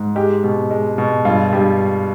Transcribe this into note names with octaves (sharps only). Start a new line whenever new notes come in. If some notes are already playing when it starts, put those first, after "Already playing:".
Already playing: G#2
G#3 G4
B2
G#3
B2
G2 F4
G2 G4